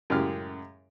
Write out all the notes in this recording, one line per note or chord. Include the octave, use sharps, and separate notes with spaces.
F#2 A2 C#3 G#3 G4 F6